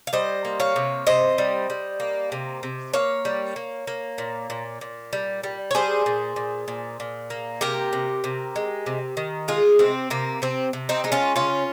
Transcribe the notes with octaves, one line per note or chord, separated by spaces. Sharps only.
F5
G3 C5 D#5
A#3
C#5 F5
C3
C3 C5 D#5
G3
G3
A#3
C3
C3
A#3 C#5 F5
G3
A#3
A#3
A#2
A#2
A#2
G3
G3
C#5
G3 G#4 C5
A#2
A#2
A#2
A#2
A#3
C3 G4 A#4
C3
C3
G#3
C3
D#3
G#3 F4 G#4
C3 C4
C3 A#3
C3 C4
C3
C4 D#4
G#3 D#4
C#4 F4
C#3 C#4 F4